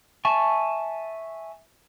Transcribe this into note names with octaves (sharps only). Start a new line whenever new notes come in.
E5 G#5 A5 C#6